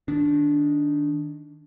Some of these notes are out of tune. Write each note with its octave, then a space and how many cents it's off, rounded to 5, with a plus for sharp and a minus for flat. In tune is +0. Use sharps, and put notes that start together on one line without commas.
D#3 +0 D4 -10